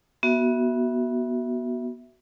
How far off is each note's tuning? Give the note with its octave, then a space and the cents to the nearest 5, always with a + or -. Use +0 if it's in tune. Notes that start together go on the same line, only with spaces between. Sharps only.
B3 -25 F#4 +5 E5 +0